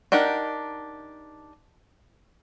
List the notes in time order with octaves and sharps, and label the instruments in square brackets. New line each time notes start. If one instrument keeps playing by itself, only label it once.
[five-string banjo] D4 D#4 G4 A#4 F#5